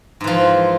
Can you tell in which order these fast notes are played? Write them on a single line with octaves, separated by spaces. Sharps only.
G#2 E3 F3